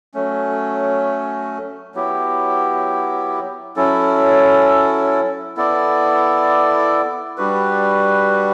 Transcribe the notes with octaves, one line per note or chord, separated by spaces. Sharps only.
F#3 A3 C#4
F#3 B3 E4 G4
F#3 C#4 E4 A4
B3 E4 A4 D5
G3 D4 F#4 B4